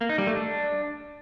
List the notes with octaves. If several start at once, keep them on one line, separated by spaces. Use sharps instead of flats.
A#3
D#4
G3
A3
D4